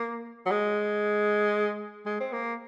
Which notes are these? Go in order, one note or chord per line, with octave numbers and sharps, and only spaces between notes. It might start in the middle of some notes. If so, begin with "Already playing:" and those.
Already playing: A#3
F#3
G#3
G#3
C4
A#3